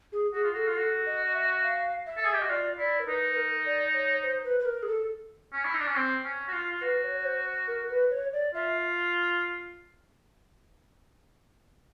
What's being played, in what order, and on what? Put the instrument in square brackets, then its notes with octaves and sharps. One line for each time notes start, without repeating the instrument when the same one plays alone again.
[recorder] G#4
[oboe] F#4 [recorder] G#4
[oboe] F4
[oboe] F#4 [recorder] A4
[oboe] F4
[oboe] F#4 [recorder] A4
[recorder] D#5
D#5
E5
F5
E5
[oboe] A4
G#4
G4
[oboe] F#4 [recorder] D#5
[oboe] F4 [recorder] D5
[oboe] E4 [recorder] D5
[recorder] A#4
[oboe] D#4 [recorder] B4
[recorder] B4
A#4
D5
C#5
C5
B4
B4
A#4
G#4
A4
[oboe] C#4
E4
D#4
D4
C#4
C4
C#4
F#4
F4
F4
[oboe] F#4 [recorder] B4
[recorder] C#5
C#5
C5
A#4
B4
C#5
D5
[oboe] F4 [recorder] E5